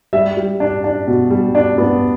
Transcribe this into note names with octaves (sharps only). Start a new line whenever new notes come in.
G3 E5
G3
D4
D4
B2
G3
D4
B3